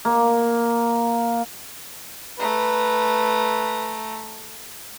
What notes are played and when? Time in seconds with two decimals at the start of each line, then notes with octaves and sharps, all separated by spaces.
0.05 A#3
2.39 A3 B4 A#5